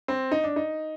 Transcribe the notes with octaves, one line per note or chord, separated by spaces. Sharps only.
C4
D#4
D4
D#4